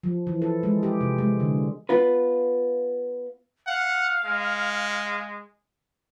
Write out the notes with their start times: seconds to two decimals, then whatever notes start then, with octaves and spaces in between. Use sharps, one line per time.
0.03 F3
0.27 E3
0.42 A4
0.63 G#3
0.83 G4
1.01 C3
1.18 G#3
1.40 D3
1.89 B3 F4 B4
3.67 F5 F#5
4.25 G#3